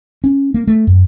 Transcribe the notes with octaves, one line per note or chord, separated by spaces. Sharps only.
C#4
A#3
A3
F#2